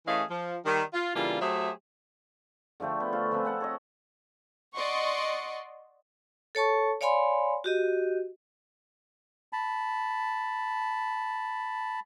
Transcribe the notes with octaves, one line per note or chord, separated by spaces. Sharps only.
E3 A3 C#4 G#4 D#5 F5
F3
D#3 G3
F4
C#3 E3 G3 A#3 D4 F4
F#3 A3 G4 G#4 C5 E5
D3 F3 A3 G5
B3
A3 F4
F3 C4 B4 G#5
C4 F#5 A5
A4 C#5 D#5
D5 D#5 F#5 C6 C#6
A4 C#5 A5 C#6
C#5 D5 F5 G#5 B5 C6
F#4 G4 D#5
A5 B5